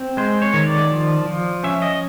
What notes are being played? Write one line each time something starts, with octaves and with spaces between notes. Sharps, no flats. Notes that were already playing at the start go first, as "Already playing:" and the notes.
Already playing: C4
G#3 C5
C#5
D#3
D5
F3
F3
C#4 E5
D#5